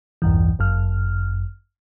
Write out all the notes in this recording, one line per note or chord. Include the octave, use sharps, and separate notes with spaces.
B1 E2 G2 E3
G1 F#2 F6